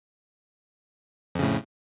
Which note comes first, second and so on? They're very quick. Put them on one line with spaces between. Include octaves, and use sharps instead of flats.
F2 C#3 A2